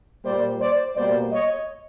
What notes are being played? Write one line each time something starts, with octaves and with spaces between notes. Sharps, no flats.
A#2 G3 A#3 C5 D5
C5 D5
B2 G3 A#3 C5 D5
C#5 D#5